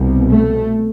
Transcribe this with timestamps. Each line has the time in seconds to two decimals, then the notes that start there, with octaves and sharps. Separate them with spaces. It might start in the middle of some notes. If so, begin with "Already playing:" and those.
Already playing: C2 B2
0.30 A3